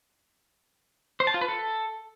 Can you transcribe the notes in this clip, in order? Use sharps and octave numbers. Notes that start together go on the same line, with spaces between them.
C5
A5
F4
B4
A4